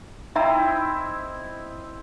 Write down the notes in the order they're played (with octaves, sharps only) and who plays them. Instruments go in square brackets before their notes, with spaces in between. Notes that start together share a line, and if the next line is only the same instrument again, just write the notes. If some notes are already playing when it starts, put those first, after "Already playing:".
[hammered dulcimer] C4 E4 D#5 [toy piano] D#4 E5 A#5